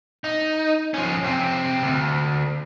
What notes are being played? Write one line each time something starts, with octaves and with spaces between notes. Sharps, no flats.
D#4
F3 C#4
F2 C3
D2